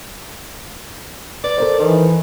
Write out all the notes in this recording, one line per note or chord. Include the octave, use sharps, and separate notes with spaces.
B4 D5
A4 A#4 C5
D#3 E3